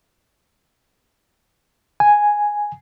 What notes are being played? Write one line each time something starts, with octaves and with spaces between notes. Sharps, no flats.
G#5